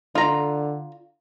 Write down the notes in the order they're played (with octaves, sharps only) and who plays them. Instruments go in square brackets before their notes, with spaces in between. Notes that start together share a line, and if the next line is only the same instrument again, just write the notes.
[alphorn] D3 [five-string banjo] F4 A#5